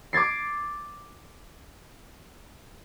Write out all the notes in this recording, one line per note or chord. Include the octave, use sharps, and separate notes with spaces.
D6 G#6 A6 C7